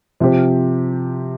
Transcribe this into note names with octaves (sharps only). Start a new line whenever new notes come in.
C3 F3 C4 G4 C5